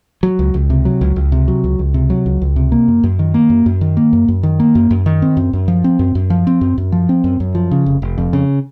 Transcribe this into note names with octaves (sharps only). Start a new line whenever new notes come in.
F#3
C#2
C#2
C3
F#3
C#2
C#2
C3
F#3
C#2
C#2
C3
F#3
C#2
C#2
C3
A#3
F#2
F#2
D#3
A#3
F#2
F#2
D#3
A#3
F#2
F#2
D#3
A#3
F#2
F#2
D#3
C4
F#2
F#2
F3
C4
F#2
F#2
F3
C4
F#2
F#2
F3
C4
F#2
F#2
F3
C#3
F1
F1
F2
C#3